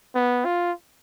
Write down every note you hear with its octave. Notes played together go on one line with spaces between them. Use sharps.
B3
F4